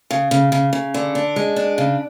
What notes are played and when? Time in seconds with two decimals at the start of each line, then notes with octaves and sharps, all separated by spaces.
0.11 C#3
0.31 C#3
0.52 C#3
0.73 C#3
0.94 D3
1.15 D4
1.36 G#3
1.56 D4
1.78 C#3